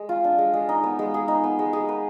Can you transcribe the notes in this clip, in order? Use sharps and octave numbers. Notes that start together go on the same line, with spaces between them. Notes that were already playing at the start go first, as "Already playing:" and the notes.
Already playing: G#3
F4
D4
G#3
G#3
D#4
B3
G#3
G#4
D#4
B3
G#3
G#4
B4